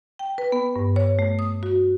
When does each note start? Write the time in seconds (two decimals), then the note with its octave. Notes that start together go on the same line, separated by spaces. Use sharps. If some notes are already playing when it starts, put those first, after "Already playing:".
0.19 G5
0.38 B4
0.52 B3
0.76 G2
0.96 C#5
1.19 A3
1.39 D#6
1.63 F#4